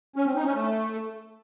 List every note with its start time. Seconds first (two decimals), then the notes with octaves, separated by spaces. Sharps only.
0.16 C#4
0.26 C4
0.35 D#4
0.45 C#4
0.54 A3